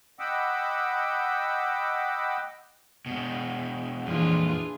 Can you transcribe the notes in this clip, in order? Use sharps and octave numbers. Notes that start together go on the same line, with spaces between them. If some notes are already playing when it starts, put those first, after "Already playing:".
D#5 F#5 G5 B5 D6 E6
B2 G#3
F2 A#2 E3 D4 F4 G#4